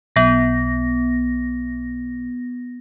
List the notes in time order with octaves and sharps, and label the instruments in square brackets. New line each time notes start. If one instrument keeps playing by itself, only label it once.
[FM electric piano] B1 [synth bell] B3 A#6